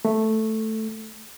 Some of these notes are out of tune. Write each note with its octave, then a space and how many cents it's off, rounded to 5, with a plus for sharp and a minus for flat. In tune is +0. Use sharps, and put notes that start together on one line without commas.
A3 +0